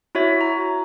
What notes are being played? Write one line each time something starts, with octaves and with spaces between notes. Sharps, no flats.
E4 F#4 C#5 E5
A#5